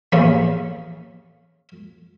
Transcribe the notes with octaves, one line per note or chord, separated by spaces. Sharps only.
A1 E2 A3 A#3 C#4